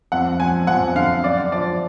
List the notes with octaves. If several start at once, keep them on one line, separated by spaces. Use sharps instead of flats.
F2 F#5
F3 G#5
F2 F#5
D3 F5
F#2 D5
F3 D5